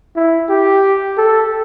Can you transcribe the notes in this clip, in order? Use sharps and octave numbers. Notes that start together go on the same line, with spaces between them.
E4
G4
A4